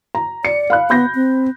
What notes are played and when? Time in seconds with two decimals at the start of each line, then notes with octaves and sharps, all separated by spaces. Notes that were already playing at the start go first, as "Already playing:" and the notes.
0.15 A#5
0.45 D5 C#7
0.70 F5 B5 F#6
0.90 B3 B5 G6 A#6
1.15 C4